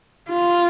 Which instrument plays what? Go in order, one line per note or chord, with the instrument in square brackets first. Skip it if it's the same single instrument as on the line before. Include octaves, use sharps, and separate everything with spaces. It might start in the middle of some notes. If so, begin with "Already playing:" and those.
[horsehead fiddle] F4